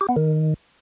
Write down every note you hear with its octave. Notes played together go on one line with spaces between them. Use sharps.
G4
B3
D#3